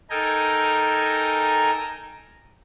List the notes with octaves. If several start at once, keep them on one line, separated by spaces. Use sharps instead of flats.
D#4 A4 A#4 G5 G#5 A#5